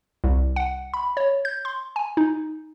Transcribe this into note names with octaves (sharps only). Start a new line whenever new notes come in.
C2
F#5
B5
C#5
G6
C6
G#5
D#4